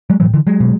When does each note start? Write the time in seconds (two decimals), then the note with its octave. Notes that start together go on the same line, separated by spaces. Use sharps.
0.10 F#3 G#3
0.20 A2 E3 F#3
0.34 D3 E3
0.47 F#3 G#3
0.60 B2